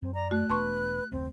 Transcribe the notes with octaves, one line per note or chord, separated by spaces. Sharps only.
F#2 C4
D5 A#5
A3 F#4 F#6
E1 B3 D4 B4 A5 C6 C#6
F#1 D#2 A3 C4